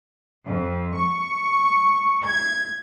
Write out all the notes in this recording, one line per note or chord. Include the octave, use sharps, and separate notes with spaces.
F2
C#6
G#6